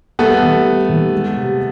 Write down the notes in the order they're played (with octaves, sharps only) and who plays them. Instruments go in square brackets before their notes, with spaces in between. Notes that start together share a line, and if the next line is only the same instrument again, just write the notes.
[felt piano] G3 [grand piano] A3 B3
[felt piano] D#2
G3
D#2
G#3
C3